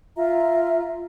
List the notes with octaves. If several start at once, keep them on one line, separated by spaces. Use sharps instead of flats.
F4 E5 A#5